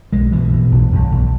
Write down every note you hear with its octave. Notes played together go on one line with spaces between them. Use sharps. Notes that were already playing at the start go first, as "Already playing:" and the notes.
B1 G#3
B2 E3
B2
B1
B1
B1